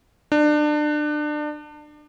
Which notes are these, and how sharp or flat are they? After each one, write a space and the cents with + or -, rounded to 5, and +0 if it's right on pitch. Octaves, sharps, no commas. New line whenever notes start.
D4 +30